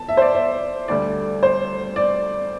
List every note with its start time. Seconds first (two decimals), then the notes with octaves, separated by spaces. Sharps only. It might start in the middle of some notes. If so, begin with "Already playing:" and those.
Already playing: A5
0.08 E5
0.17 C5
0.22 D5
0.35 E5
0.88 D2 D3 G3 D5
1.43 C5
1.96 D5